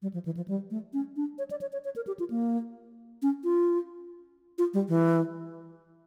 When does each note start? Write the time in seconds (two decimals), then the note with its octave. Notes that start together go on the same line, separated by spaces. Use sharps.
0.02 G3
0.14 F3
0.25 E3
0.37 F3
0.48 G3
0.70 A3
0.93 C#4
1.16 D4
1.38 C#5
1.51 D5
1.61 C#5
1.73 C#5
1.85 C#5
1.96 A#4
2.07 G4
2.19 F4
2.30 A#3
3.22 C#4
3.44 F4
4.58 F4
4.74 G3
4.89 E3